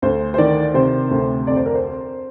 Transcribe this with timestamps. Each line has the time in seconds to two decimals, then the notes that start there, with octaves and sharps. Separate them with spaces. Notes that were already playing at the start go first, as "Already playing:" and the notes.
0.02 D2 C5
0.34 C5
0.38 D#3 D5
0.74 C3 C5
1.11 D2
1.47 F2 D5
1.56 C5
1.66 A#4
1.75 C5